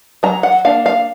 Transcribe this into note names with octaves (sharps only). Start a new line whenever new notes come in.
F#3 A#5
F#5
A#3 D4 F5
F5